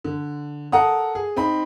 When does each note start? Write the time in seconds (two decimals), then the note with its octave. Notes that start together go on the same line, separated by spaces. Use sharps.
0.04 D3
0.72 A4 A#4 F#5 A#5 D#6
1.15 G#4
1.36 C4 D#4 B5